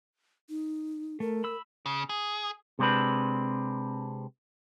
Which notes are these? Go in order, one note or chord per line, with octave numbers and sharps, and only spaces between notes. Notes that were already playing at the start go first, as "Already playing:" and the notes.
D#4
A3 A#4
B5 E6
C#3
G#4
C3 G#3 C4 D4 B4